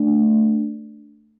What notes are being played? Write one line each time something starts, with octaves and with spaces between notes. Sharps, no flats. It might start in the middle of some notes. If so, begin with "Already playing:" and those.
Already playing: A3 D4